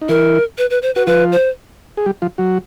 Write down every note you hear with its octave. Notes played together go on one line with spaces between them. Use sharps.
D#4
E3 E4 A#4
B4
B4
C5
F#4 B4
F3 F4 B4
C5
G#4
G3 G4
F3 F4
F#3 F#4